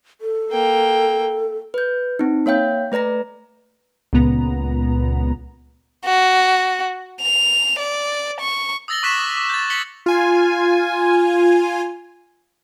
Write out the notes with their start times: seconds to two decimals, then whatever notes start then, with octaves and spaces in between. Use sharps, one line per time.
0.21 A4
0.51 A#3 G5
1.74 B4 G6
2.19 C4 D#4
2.46 A#3 C#5 F5 G5 G6
2.92 A3 B4 D5 A#5 A#6
4.13 C#2 A#2 B3 A#5
6.06 F#4
7.22 F7
7.79 D5
8.40 C#6
8.88 D#6 E6 A6 A#6 F#7 G7
9.03 C#6 D6 F#6 B6 E7 F#7
9.18 D6 D#6
9.37 D6
9.49 G6 A6
9.70 B6 C#7 F#7 G7
10.06 F4 G#5